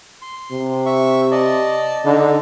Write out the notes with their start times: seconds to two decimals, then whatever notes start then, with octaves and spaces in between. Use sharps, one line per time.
0.22 C6
0.51 C3
0.86 E5 C#6
1.32 D5 D#5 A5
2.05 D3 D4 D#4